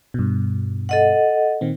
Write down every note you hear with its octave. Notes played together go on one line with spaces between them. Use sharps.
G2 B2
A4 D#5 F#5
A#2 D#3 C4